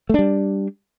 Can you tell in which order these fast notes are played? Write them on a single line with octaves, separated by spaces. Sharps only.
A3 D4 G3